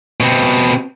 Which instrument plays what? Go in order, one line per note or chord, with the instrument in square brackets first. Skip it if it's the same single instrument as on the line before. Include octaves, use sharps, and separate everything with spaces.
[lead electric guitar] B2 C4